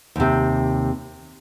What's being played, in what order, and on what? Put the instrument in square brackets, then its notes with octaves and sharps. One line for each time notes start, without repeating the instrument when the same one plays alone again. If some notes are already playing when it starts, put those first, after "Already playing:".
[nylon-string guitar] D#2 C3